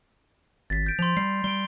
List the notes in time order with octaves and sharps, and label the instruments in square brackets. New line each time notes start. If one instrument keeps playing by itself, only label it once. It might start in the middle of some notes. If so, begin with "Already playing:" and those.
[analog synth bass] G#1 [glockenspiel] A6 B6
[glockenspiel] G6 D7
[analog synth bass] F3 [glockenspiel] C6 F7
[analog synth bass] G3 [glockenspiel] C7
[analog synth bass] G3 [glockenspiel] D7 G7